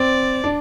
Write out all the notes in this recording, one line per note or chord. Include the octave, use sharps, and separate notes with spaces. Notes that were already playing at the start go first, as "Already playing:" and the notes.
Already playing: C4 D5
D4